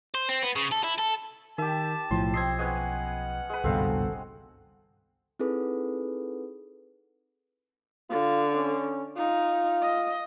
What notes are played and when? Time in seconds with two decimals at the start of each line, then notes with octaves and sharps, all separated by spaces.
0.14 C5
0.29 C4
0.43 B3
0.56 C#3
0.72 A4
0.83 E4
0.98 A4
1.58 D#3 G4 E5 A5
2.11 B1 A2 F3 C6
2.34 C4 D#5 G#6 C7
2.59 G#3 B3 C#4 F#5
3.50 G#3 B4
3.64 G#1 C#2 G2 B2 C4 A4 F5
5.39 C4 D#4 E4 G#4 A4 B4
8.10 D3 F4
8.54 C#4
9.17 D#4 F4
9.82 D#5